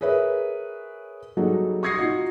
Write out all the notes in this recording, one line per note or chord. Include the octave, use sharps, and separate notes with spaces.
G#4 A#4 B4 C#5 E5
F#3 G3 D#4 F#4 G#4 A4
C#6 D#6 G#6 A#6 C7 C#7
D#4 F4 F#4